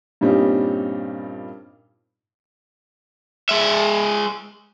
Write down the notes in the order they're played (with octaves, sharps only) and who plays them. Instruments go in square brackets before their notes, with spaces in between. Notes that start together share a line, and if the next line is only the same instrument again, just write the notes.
[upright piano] G2 A#2 G3 C4 C#4 D#4
[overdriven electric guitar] G#3 E5